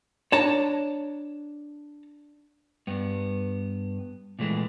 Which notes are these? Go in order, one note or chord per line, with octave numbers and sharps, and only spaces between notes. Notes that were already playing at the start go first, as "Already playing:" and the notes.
D4 C#5 A5 A#5
G2 B3
A#2 E3 G#3 A3